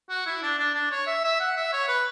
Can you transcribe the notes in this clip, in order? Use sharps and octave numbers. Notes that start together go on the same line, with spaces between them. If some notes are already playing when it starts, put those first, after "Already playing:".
F#4
E4
D4
D4
D4
C#5
E5
E5
F#5
E5
C#5
B4